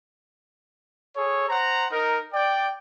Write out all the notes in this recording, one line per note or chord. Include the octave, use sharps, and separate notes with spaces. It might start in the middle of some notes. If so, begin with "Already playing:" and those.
G#4 A4 C#5
C5 F#5 A#5
D#4 A#4
D5 G5